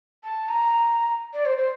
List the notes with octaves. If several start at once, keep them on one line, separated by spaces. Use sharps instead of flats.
A5
A#5
D5
C5
C5